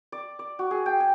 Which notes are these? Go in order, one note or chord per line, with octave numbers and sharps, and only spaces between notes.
D5
D5
F#4
G#4
G5
G#5